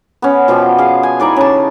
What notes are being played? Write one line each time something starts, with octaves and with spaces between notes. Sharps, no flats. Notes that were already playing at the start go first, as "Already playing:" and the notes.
B3 C#4
B2 F3 D5 G5
G#4 F5
G#5
D#4 E4 D5 G#5
C#3 A5